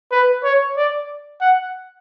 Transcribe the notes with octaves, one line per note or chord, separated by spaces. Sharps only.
B4
C#5
D5
F#5